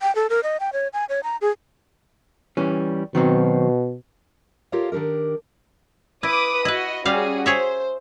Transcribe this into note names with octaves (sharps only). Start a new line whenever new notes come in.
G5
A4
A#4
D#5
G5
C#5
G#5
C#5
A#5
G#4
E3 G3 C#4
B2 D#3 F#3 C4
F4 G4 A4 A#4 C#5 F5
D#3 D4 D#4 G4 A#4
E4 B4 D6 D#6
E4 F#4 B4 D#5
G3 C#4 F#4 G#4 F5
G#4 C5 C#5 E5